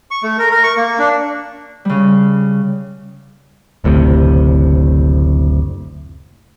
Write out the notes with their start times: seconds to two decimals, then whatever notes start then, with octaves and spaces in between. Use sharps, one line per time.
0.11 C#6
0.23 A3
0.39 A#4
0.51 A#4
0.64 C#6
0.77 A#3
0.99 D4
1.85 C#3 G3
3.84 F#1 D2 A2 C3